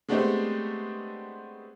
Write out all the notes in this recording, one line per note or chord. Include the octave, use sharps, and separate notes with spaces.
G#3 A3 B3 C4 D4 G4